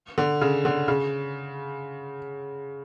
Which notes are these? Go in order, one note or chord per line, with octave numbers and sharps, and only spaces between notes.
D3
C#3
D3
C#3